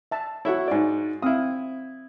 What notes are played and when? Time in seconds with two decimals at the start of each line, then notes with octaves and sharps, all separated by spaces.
0.11 E5 A5
0.45 E4 F#4 A4 C#5 E5 F#5
0.68 G#2 D5
1.22 C4 E4 F5 D#6